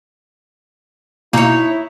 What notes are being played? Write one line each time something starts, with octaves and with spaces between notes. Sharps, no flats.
B2 A#3 D#4 E4 C#5